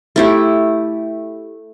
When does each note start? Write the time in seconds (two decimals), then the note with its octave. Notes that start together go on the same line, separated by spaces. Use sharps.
0.16 A3 E4 G4